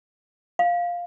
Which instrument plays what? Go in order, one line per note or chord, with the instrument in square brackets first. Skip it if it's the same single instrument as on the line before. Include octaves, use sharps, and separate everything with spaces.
[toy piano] F5